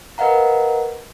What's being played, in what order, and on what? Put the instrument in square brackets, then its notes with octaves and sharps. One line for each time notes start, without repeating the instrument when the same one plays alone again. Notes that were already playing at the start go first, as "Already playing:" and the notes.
[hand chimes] A#4 B4 D#5 F5 F#5 A#5